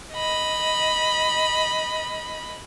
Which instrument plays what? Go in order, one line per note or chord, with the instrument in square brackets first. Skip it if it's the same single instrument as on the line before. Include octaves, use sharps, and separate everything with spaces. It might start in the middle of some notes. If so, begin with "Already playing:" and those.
[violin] D#5 B5